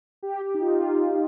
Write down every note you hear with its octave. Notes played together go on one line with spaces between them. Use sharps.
G4
G4
D#4
F4
F4